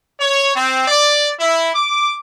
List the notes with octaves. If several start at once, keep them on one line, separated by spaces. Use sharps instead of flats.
C#5
C4
D5
E4
D6